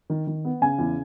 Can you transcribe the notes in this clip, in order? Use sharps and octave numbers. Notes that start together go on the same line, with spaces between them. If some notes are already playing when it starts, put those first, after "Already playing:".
D#3
D#3
B3
C#3 G#5
E2